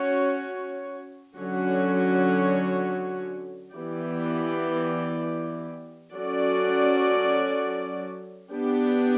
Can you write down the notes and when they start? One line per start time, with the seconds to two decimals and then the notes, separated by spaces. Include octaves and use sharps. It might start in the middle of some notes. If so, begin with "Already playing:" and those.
Already playing: C#4 F#4 C#5
1.36 D3 F#3 C#4 F#4 C#5
3.74 E3 B3 E4 G4 D5
6.12 F#3 C#4 F#4 A4 D5
8.50 B3 D4 G4